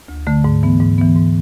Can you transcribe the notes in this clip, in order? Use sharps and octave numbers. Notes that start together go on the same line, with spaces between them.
D2
D3 A3
G#2
E3 B3
G#2
E3 B3
G#2